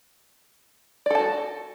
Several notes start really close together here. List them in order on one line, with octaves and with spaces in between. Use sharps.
D5 A4 A5 F#4